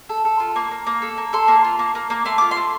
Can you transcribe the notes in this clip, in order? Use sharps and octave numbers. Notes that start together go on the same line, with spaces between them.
A4
A4
F4
A#3
A#3
A#3
A4
A#3
A4 C6
A#3
F4
A#3
A#3
A#3
A3 C6
F4 D6
A3 C6